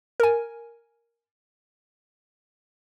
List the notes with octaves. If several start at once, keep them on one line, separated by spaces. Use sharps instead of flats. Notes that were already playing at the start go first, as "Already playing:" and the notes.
A#4 G#5